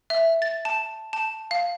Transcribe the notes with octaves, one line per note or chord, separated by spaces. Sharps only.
E5
A6
A5
A5
F5